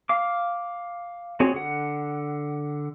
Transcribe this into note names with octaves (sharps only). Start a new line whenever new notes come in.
F5 D6
C4 F#4 G#4 C#5
D3 F#5